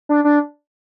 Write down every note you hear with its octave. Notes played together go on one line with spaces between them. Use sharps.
D4
D4